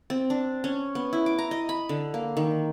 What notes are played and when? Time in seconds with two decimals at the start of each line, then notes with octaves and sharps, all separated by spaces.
0.10 C4
0.30 D4
0.64 C#4
0.95 B3
1.13 E4
1.26 D6
1.39 A#5
1.51 D#5
1.69 B5
1.89 D3
2.14 A#3
2.37 D#3